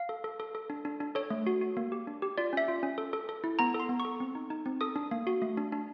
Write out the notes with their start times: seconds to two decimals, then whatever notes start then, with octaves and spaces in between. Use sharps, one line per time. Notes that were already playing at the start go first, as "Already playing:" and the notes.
Already playing: F5
0.09 A4
0.24 A4
0.40 A4
0.55 A4
0.70 D4
0.85 D4
1.00 D4
1.15 A4 C#5
1.30 A3
1.47 F#4
1.61 F#4
1.77 A#3
1.92 G4
2.07 D4
2.22 G4
2.38 F4 D5
2.53 C#4 E5
2.68 F4
2.83 C#4
2.98 A4
3.13 A4
3.29 A4
3.44 E4
3.59 B3 A#5
3.74 A4
3.80 C6
3.89 B3
4.00 C#6
4.05 A4
4.20 C4
4.35 D#4
4.50 D#4
4.66 C4
4.81 A4 D#6
4.96 D4
5.11 A#3
5.27 F#4
5.42 A3
5.57 D4
5.72 D4